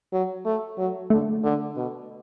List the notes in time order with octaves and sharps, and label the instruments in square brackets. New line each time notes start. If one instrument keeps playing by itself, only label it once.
[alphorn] F#3
A3
F#3
[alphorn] D3 [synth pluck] A3
[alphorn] D3
B2